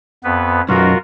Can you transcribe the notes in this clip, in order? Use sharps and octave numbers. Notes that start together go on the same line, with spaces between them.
F2 B3 B4
B1 F#2 F4 F#4 A#4